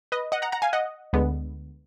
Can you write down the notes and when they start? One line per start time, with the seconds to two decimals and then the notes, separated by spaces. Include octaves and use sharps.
0.12 B4 D#5
0.32 D#5 F#5
0.42 F#5 A#5
0.52 F#5 A#5
0.62 F5 G#5
0.73 D#5 F#5
1.13 D2 D3 G#3 B3